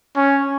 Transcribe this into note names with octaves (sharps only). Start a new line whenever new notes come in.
C#4